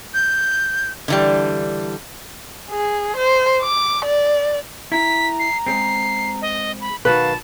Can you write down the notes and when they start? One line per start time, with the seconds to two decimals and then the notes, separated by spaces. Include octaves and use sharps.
0.14 G6
1.08 D3 E3 G3
2.71 G#4
3.17 C5
3.62 D6
4.05 D5
4.92 E4 A#5 B6
5.39 C7
5.67 G#3 C4 C7
6.42 D#5
6.81 B5
7.05 B1 D#3 F#4 B4 F5 A5